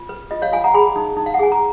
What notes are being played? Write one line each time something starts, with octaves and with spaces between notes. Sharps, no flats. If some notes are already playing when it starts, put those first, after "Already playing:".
Already playing: F4
B4
F4 D#5
C#5 F5
F4 F5 G#5
F#5 A#5
G#4 G#5 B5
D#4
D#4
F5
F#5
G#4 G#5
A#5